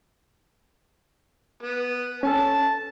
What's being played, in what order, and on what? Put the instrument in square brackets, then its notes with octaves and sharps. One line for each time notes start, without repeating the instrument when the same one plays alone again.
[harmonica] B3
[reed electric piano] C#4 A4 [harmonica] A5